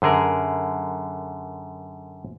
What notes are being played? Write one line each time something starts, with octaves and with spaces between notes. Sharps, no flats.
F#2 D3 G#4 A#4